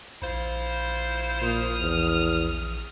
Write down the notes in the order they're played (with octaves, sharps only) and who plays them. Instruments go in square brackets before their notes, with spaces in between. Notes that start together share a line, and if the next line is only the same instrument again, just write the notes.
[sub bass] A#1 [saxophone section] E4 F4 C5
[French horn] A#2 [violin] D#6 F6
[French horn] E2